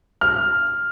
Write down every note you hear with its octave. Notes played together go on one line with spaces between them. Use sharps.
F6